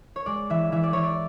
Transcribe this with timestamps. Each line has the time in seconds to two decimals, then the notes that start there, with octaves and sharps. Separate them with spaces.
0.16 C#5
0.26 G#3 D5
0.50 E3 E5
0.72 E3 E5
0.83 D5
0.93 E3 C#5
1.04 D5